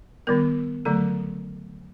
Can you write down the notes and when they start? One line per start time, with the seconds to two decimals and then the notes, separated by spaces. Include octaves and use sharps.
0.27 D#3 G3 B3 A#4
0.85 D3 F#3 A3 A4